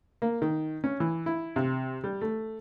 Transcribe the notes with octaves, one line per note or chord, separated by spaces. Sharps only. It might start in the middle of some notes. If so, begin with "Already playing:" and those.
A#3
D#3
C#4
E3
E4
C3
G3
A3